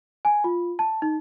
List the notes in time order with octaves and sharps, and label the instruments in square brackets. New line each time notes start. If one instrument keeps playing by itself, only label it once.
[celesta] G#5
F4
A5
D#4